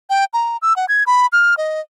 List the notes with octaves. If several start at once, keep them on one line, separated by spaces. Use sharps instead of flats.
G5
A#5
E6
F#5
G#6
B5
F6
D#5